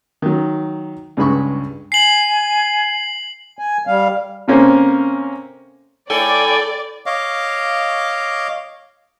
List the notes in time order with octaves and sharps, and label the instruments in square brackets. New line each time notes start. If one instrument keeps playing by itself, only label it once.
[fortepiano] D#3 F#3
C#2 G2 G#3 B5 C#6
[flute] G#5 [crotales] C7 F#7
[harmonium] G#5
G3 F5
[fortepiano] C3 A#3 C#4 A4 C5
[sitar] A2 A4 [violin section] D5 [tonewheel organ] G5 G#5
[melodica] C#5 D#5 F5 D6